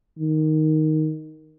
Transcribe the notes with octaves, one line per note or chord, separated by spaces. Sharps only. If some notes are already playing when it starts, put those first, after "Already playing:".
D#3